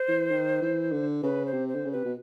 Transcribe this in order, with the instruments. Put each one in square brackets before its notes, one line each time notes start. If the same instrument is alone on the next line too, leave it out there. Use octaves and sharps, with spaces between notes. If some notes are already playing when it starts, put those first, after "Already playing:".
Already playing: [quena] C5
[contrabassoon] E3
D#3
E3
D3
[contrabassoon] C#3 [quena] B4
[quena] C5
[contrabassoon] C3
[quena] C5
[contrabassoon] D3
C#3
[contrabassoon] C3 [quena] B4
[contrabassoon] B2